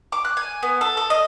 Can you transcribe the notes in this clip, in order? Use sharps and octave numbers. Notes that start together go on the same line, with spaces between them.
D6
F#6
G#5
B3
A4
A4
D#5